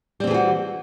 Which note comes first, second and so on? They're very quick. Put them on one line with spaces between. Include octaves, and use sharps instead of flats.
G3 C4 E3 G#4 F#4